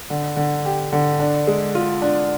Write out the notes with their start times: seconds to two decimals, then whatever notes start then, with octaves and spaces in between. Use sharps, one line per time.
0.10 D3
0.37 D3
0.65 G4
0.92 D3
1.20 D4
1.47 G#3
1.75 F4
2.02 D4